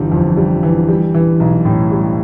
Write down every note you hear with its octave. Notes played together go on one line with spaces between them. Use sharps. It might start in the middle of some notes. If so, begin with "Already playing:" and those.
Already playing: G1 E3 G3
F2
G3
E3
G3
E3
B1
A2
G3